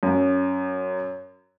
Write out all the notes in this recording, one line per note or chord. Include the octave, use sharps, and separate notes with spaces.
F#2